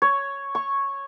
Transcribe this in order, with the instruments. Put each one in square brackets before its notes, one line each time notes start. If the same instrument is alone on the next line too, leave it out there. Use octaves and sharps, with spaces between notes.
[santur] C#5
C#6